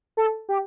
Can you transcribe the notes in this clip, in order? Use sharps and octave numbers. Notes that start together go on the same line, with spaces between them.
A4
G4